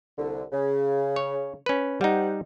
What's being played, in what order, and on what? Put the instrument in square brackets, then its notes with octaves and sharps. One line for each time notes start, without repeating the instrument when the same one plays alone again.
[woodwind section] C2 D3
C#3
[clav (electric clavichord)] C#5
C#4 B4
[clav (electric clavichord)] G3 D#4 [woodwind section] G4 C5 F#5